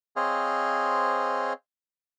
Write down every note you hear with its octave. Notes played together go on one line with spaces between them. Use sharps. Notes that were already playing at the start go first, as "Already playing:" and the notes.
C4 G#4 C5 C#5 D#5 F5